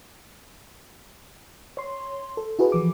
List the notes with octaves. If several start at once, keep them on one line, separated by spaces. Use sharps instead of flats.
C#5 C6
A4
E4 F#4 G#4 B4
E3 F3 D6